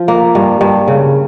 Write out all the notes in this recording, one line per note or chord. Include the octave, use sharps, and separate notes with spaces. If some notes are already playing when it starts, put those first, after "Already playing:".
Already playing: F3
A#3
G2
G2
C#3